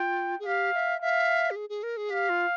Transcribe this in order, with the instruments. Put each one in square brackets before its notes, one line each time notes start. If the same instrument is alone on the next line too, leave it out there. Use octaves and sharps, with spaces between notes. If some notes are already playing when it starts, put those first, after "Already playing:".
Already playing: [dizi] F4 [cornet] G5
[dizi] G#4
[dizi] G4 [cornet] F5
[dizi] E5
[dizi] E5 [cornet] F5
[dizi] G4
G#4
G#4
A#4
G#4
[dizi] G4 [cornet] F5
[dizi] F4